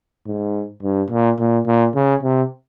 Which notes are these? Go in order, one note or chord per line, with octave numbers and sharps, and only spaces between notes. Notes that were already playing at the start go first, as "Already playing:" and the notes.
G#2
G2
A#2
A#2
A#2
C#3
C3